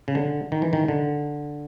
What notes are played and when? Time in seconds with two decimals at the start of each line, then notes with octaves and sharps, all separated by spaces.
0.08 C#3
0.15 D3
0.52 D#3
0.62 E3
0.73 D#3
0.88 D3